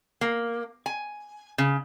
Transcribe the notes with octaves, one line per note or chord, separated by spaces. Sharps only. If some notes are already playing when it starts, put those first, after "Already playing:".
A#3
G#5
C#3